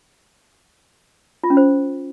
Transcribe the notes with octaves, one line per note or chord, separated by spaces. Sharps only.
F4
C#4
C5